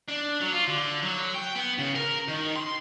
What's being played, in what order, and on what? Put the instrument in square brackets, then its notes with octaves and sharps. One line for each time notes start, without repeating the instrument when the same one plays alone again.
[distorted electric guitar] D4
F#3
F4
D3
F#3
G5
B3
C#3
A#4
D#3
C6